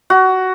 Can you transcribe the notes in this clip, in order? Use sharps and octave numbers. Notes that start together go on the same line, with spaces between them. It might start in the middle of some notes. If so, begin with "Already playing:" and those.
F#4